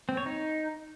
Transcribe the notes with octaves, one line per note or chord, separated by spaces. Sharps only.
C4
C#5
D#4